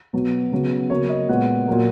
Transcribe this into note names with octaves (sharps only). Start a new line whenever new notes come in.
B2 F#3 B3
C#3 F#3 B3
C#3 F#3 A#3 C#5
D#5
A#2 G#3 B3 F#5
A#2 F#3 A#3